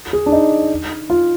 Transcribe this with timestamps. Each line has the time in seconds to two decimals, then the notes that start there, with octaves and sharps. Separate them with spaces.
0.13 G#4
0.26 D4
0.32 D#4
1.10 F4